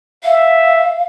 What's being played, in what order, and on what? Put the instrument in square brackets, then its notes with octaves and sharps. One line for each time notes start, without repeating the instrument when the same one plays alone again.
[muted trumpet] E5 [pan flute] F5